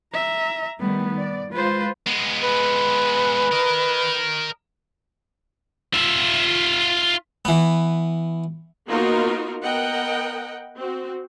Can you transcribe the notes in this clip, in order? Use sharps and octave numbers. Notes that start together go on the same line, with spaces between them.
E5 A#5
D#3 G3 A3 B3
D5
G#3 F4 B4 C5
G#3 B3
B4
A#4 D#5
F4 E5
E3 B3
A#3 B3 D#4 F4 F#4 A#4
B3 A#4 D#5 F#5 G5
C4 F#4